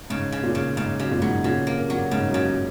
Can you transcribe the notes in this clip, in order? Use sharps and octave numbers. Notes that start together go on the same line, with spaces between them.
G#2 C#3
C#3
A#2
C#3
G#2 C#3
F#2 C#3
A#2
G#2 F#3
A#2 C#3
C3 A#3
A#2 F#3
G#2 C#3
F#2
C#3
F#2